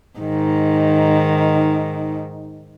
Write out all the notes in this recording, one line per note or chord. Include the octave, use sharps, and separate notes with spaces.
G#2 D#3